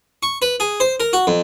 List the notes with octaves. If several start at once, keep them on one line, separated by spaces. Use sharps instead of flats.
C#6
B4
G#4
C5
A#4
F#4
F2